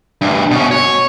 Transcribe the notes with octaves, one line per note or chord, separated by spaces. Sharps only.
D2 G2
B2 C#4
C#5